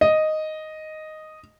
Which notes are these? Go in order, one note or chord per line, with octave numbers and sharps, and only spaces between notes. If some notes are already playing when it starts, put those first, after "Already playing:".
D#5